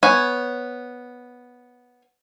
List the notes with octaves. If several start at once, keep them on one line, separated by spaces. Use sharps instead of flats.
B3 C#5 G#5